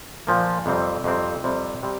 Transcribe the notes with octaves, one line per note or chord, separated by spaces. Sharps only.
A#2 F3 A#3
F2 C3 G3 C4
F2 C3 G3 C4
F2 C3 G3 C4
C3 G3 C4